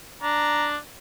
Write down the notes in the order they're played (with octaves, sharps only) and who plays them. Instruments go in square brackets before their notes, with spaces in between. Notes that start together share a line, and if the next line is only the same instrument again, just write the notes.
[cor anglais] D4 [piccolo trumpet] A#5